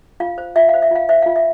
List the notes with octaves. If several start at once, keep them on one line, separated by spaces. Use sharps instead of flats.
F4 F5
C5
F4 E5
F5
C5
E5
F4 F5
C5 E5
F4 F5
E5